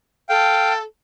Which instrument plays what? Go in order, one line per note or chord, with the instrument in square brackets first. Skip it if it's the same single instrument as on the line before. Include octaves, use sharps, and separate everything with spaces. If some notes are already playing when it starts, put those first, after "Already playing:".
[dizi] A4 [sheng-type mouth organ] F5 G5